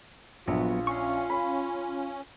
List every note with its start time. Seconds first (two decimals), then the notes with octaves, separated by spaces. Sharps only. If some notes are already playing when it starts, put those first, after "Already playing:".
0.48 A#1 F#3 B3 F4
0.87 C#4 F5 C#6
1.30 B5